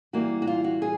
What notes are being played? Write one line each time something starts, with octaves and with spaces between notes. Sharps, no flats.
E3 G3 A#3 F#4
F#4
F4
F#4
G#4